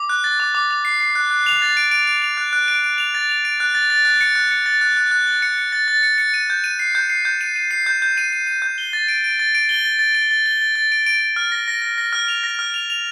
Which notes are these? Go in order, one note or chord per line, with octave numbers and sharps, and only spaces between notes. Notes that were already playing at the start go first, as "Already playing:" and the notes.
Already playing: D6
F#6
A6
D6
D6
D6
C7
C7
F#6
F#6
F7
A6
D7
D7
D7
F7
F#6
F#6
D7
D7
F7
A6
F7
D7
F#6
A6
A6
F#6
C#7
F#6
C#7
A6
F#6
F#6
F#6
A6
C#7
C#7
A6
A6
C#7
C#7
D#7
G6
D#7
C7
G6
C7
G6
D#7
D#7
C7
G6
G6
D#7
D#7
D#7
G6
G7
A6
D7
D7
A6
D7
G7
A6
A6
D7
A6
G7
A6
A6
D7
D7
D7
F6
A#6
A#6
A#6
A#6
F6
F7
A#6
F6
F7
F7